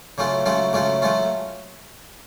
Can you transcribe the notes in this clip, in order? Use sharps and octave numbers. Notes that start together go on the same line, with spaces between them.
C#3 F#3 A3 C#4 F4
C#3 F#3 A3 C#4 F4
C#3 F#3 A3 C#4 F4
F#3 A3 C#4 F4